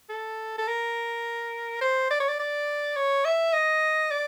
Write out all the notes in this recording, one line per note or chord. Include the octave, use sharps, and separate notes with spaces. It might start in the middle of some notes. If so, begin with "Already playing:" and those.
A4
A4
A#4
C5
D5
C#5
D5
D5
C#5
E5
D#5
D5